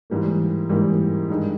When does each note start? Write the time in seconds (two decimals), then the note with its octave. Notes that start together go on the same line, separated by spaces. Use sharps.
0.10 G#2 E3 G3 A#3
0.69 G#2 E3 G3 A#3
1.29 G2 D#3 G#3